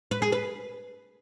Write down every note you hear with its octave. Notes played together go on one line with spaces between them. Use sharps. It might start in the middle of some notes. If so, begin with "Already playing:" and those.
B4
G#4
B4